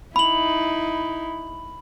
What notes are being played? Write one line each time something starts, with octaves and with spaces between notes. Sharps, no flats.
D#4 E4 B5 F#7